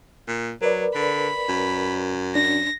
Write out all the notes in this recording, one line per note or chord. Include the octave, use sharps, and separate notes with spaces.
A#2
F#3 A#4 B4 D5
D3 B5
F#2
D4 A#6